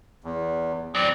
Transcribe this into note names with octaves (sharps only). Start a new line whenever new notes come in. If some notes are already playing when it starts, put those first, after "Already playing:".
E2
F#3 C4 D5